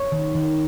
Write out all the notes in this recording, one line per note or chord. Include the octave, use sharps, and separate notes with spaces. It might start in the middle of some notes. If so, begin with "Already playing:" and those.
Already playing: C#5
D#3
D#3